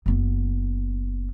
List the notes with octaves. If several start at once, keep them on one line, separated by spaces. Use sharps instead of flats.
F#1 B3